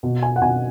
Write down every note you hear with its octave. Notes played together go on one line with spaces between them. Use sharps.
B2
G#5
F#5
B2 G#5